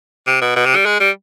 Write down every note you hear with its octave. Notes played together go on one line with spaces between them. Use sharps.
C3
B2
B2
C3
G3
G#3
G3